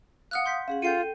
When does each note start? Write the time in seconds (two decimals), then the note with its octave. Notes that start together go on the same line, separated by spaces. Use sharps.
0.31 F5 F#5 D#6 F6 F#6
0.46 C6 G6 B6
0.68 C#4 G#4 F5 F#5
0.82 F4 A4 G5 G6 C7 C#7 D#7